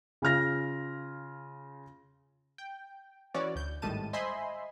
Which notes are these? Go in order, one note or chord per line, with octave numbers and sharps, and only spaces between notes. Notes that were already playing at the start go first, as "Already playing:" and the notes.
C#3 F4 F6 A#6
G5
E3 C#4 F#4 C#5 D5
D2 G6
G#1 A2 G3 G#3 A5 D#7
C5 D#5 E5 G#5 B5 C6